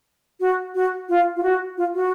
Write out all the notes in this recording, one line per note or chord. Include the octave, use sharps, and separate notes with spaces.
F#4
F#4
F4
F4
F#4
F4
F#4